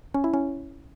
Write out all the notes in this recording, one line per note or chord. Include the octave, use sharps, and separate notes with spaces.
C#4
E4
C#4